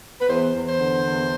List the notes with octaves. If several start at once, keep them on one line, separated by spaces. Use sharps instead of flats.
B4
E2 C5
E2
C5
D3
E2